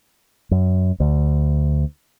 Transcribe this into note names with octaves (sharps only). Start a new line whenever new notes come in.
F#2
D2